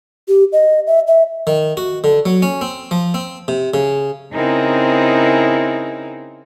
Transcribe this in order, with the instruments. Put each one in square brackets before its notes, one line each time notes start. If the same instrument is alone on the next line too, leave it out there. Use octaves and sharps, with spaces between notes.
[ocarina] G4
D#5
E5
E5
[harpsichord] D#3
F#4
D3
F#3
C#4
C4
F3
C4
C3
C#3
[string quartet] C#3 C4 D#4 E4 G#4 A#4